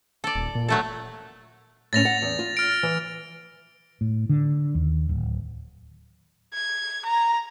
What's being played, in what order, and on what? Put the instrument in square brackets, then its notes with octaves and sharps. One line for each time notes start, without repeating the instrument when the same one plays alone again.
[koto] A4 D5
[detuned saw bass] D#1
A#2
[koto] F#3 A3 A4
[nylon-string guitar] A2 C#4 [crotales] A6 A#6 F7
[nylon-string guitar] F#5
E2
F4
[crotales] F6 D7
[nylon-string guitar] E3
[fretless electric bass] A2
D3
D#2
D1
[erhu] G#6
A#5